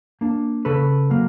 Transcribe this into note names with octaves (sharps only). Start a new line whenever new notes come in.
A#3 D4
C#3 A4 B4
F#3 A#3